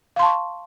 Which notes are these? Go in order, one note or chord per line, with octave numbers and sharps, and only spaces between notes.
F5 A5 C6 C#6